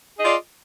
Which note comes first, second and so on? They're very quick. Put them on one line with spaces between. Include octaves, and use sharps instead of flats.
G#4 D#5 F4 D5